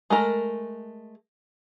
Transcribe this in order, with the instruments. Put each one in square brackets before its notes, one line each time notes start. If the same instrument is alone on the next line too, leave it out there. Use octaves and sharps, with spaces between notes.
[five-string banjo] G#3 A3 A#4